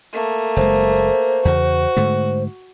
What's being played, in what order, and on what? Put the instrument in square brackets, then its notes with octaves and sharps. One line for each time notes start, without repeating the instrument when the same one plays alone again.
[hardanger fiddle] A3 A#3
[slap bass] F#1 G#3 [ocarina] C5
[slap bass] E2 C#3 [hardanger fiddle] F#4
[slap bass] G#2 D3 A3